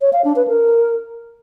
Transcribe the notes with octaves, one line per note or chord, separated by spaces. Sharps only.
C#5
F5
D4
B4
A#4